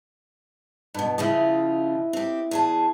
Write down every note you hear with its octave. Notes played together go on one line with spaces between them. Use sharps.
G2 B2 B4
C#3 F3 E4 F4 D#5
C4 G4
E2 G#4 A5